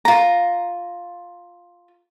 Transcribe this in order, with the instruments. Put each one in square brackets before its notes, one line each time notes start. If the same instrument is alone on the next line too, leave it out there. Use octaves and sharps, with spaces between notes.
[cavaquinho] F4 A#5